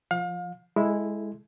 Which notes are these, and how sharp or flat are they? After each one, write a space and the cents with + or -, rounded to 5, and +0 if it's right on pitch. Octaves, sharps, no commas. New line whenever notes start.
F3 +0 F5 +35
G#3 +0 E4 +0 A4 -25